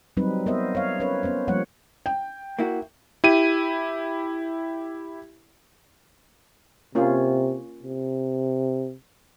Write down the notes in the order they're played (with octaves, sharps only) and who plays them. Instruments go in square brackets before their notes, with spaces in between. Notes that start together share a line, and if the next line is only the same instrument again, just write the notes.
[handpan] F#3 G3 C4 D#4 B4
B3 A#4 C5 D#5 E5
C#5 F5
C#4 A#4 B4 C#5
B3 C#4 C5
F3 G3 A#3 C#5 F#5
[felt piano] G5
[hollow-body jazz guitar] A#3 E4 F#4
[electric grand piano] E4 G4 D#7
[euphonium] C3 [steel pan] A#3 C#4 F4
[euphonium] C3